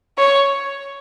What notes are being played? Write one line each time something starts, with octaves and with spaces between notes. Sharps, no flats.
C#5